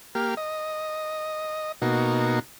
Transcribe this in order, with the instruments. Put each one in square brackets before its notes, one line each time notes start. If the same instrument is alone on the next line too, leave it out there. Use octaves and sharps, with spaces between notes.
[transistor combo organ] A#3 G4 F6
D#5
B2 A#3 D#4 F#4